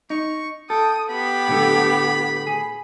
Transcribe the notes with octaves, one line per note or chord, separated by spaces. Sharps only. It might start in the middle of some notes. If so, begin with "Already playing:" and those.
D#4 C#6
A4 G5 D#6
B3 G4 B5
A2 D3 A3
G#4